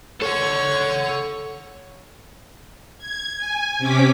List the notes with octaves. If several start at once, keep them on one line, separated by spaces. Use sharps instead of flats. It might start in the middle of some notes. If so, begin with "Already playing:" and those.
A4 C#5 F#5
G#6
G#5
C3 C#4 D6 B6